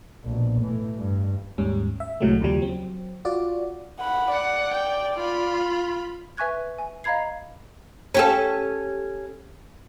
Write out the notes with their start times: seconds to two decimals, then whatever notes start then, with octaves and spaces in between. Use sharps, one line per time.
0.24 A#1 B2
0.60 A2 E3
0.98 G2
1.58 D#2 G#2 G3 C#4
2.00 E5
2.21 C2 A2 C3 F#3 G#3 A3
2.41 D#2 C#3 F3 G3
2.60 F#3 C4
3.25 F4 F#4 D5
3.99 F#5 B5
4.32 D5 F#5
4.73 G5
5.15 F4 B5
6.37 B4 E5 G#5 C#6 F#6 G#6
6.78 G#5
7.04 D#5 F5 A#5 B5 G#6 C7
8.14 C#4 G4 A4